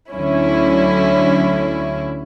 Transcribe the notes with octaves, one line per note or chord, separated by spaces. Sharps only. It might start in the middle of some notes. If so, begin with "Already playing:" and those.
D2 D3 F#3 C#4 E4